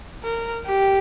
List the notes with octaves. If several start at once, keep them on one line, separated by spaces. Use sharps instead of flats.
A#4
G4